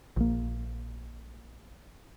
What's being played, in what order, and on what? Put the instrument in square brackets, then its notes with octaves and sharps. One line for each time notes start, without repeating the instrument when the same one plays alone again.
[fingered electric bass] A#1 A#3